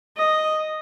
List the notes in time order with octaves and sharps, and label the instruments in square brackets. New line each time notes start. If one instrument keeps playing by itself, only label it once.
[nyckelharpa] D#5